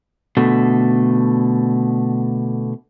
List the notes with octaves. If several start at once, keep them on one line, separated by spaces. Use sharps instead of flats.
B2 D3 A3